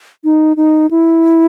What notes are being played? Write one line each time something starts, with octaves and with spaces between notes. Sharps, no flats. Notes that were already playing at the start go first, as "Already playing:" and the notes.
D#4
D#4
E4